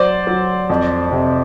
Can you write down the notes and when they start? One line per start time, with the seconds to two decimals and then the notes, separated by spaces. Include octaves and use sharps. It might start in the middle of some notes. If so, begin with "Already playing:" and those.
Already playing: F#3 C5 D5
0.27 F#3
0.69 F2
1.12 C3